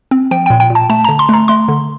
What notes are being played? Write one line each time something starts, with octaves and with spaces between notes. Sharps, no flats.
C4
F3 G5
G5
A#2
G5
A#2
A5
A3 A5
A#5
D3
C6
A3 A#5
A3 C6
D3